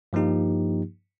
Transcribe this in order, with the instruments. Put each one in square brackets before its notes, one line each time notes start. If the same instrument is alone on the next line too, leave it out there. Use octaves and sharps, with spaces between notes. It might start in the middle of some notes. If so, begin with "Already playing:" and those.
[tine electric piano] G2 F3 A#3 D#4 G4